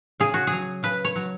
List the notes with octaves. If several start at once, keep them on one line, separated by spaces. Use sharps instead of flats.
C#3 G#4
F#4
G#4
F#3
C#3 B4
C#5
F#3